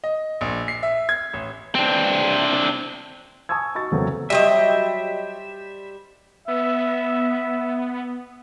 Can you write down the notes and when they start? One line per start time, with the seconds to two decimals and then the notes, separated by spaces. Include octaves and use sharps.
0.04 D#5
0.41 A#1
0.68 C7
0.83 E5
1.09 G#6
1.33 A1
1.75 C4 D4
3.49 G#5 A5 C#6 D#6 E6 G#6
3.75 D#4 F#4 C#6 A6
3.91 E2 C#3 F#3 A3 A#3 C4
4.30 F#3 G3 G4 C5 D#5 E5
6.48 B3 E5